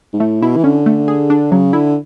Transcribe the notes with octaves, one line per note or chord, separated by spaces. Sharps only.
G#2
A2 A3
B2 E4
E3
D3 C#4
A3
G#4
D4
C#3 F#3
D3 E4